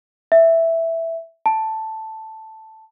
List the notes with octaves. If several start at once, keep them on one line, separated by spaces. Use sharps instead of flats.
E5
A5